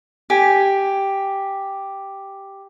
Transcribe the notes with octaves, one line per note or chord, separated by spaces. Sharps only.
G4 G#5